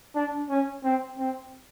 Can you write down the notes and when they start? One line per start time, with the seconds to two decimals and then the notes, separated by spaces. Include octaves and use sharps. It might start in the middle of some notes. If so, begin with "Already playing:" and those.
0.15 D4
0.49 C#4
0.84 C4
1.18 C4